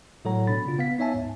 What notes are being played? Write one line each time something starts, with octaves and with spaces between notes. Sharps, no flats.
A2 F#3 A4 C#5 F#5 A#5
B2 D4 B5 A6
C#3 F4
B3 F5 B6
B3 D#4 C#5 E5 G#5 A5
D2 G#2